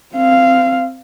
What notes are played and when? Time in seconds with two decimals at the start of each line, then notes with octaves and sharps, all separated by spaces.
0.15 C4 F5